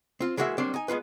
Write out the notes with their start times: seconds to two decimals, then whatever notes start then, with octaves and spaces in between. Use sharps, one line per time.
0.20 C4 F4
0.37 E3 G#3 A#3 F#4 G#4 E5
0.58 F#3 G3 A#3 C4 D4
0.74 D#4 G#5
0.88 G#3 B3 F4 B4